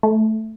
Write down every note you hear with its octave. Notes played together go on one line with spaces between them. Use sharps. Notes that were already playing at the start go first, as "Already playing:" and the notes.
A3